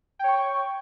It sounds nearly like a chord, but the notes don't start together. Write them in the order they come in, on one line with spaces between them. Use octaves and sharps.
G5 C#5 C#6